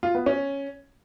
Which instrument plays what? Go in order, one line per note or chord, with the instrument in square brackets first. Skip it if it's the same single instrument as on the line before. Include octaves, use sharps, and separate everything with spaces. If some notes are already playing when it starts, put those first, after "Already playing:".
[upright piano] F4
B3
C#4